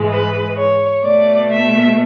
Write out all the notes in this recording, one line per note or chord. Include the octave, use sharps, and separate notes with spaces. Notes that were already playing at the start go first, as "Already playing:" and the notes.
Already playing: G#2 E3 G#3
B4
C#5
B2 A3 D5
E5